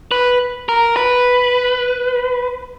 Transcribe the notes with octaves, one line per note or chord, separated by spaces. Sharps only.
B4
A#4
B4